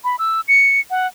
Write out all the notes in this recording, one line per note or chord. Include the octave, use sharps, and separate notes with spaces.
B5
E6
C#7
F#5